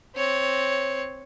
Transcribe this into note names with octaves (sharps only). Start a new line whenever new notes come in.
C4 C#5